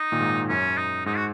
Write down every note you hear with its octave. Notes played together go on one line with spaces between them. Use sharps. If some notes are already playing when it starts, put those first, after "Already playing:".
Already playing: D#4
A#2 D#3
G#2
F#2 C#4
D#4
G#2 D#4
F#4